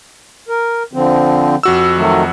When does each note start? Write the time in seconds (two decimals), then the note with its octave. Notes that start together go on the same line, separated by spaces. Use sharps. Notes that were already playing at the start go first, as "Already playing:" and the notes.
0.49 A#4
0.93 D3 F3 C4
1.63 F2 F#4 E6
1.97 D#3 F#3 A3